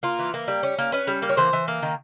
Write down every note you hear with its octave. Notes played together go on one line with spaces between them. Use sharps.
A#3 F4
E3
A#3
G3
C#4
A#3
C#4 B4
G3
A#3
C#5
E3 C5
E3
A#3
D#3